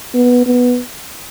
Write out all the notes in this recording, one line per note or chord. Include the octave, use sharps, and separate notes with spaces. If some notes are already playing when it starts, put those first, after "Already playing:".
B3
B3